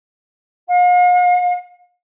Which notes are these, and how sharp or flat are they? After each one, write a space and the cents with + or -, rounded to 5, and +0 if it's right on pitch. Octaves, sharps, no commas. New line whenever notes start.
F5 +45